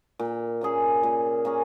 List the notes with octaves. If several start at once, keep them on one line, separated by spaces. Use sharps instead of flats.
A#2
A#3 C#4 G#4
A#2
A#3 C#4 G#4